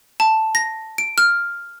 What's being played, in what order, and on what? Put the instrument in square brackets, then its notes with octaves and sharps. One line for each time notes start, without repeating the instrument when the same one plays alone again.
[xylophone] A5
A#6
D7
F6